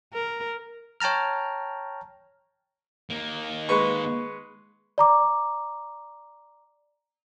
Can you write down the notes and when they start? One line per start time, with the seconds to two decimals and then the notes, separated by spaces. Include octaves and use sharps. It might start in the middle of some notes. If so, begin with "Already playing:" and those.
0.13 A#4
1.00 C#5 G5 A5 A#5 F6
3.10 D#3 A#3
3.69 G#3 B4 C#6
4.98 D5 A#5 D6